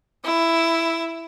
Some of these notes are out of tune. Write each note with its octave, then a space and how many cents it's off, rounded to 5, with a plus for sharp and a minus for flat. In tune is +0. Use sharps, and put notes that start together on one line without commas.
E4 +5